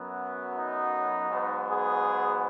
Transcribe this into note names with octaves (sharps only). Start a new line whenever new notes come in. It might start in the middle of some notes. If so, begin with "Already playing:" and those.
Already playing: F#2 F#3 B3
D#4
G#2 F#3 B3
G#4